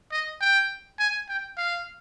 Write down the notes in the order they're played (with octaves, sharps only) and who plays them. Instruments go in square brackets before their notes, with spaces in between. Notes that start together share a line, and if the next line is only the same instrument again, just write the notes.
[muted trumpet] D#5
G5
G#5
G5
F5